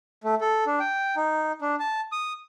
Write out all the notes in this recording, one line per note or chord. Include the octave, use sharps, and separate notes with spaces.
A3
A4
D4
G5
D#4
D4
A5
D#6